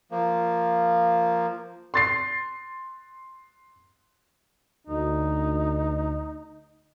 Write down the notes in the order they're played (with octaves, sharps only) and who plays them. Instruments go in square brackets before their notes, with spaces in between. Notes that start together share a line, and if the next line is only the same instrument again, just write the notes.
[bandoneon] F3 A#3
[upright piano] C6 A6 C7
[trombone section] D2 [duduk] D#4